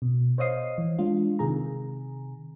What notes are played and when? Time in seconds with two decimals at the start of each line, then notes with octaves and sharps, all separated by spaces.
0.02 B2
0.38 C5 C#5 D#5 F5 D#6 C7
0.78 E3
0.99 G#3 D4 F4
1.39 C3 D#3 G#4 A#5